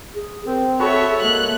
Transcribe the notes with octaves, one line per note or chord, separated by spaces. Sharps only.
G#4
C4 A#4
F#4 G#4 A4 C#5 E5 B5 C#6
G#3 A#3 F#6 F7